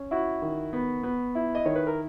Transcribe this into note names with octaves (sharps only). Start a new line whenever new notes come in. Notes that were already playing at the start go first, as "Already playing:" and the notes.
Already playing: C#4
E4 F#4
D#3
B3
B3
E4
D#5
D#3 C#5
B4
A#4